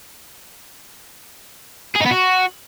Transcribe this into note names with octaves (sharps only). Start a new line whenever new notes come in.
G#4
D#4
B3
F#4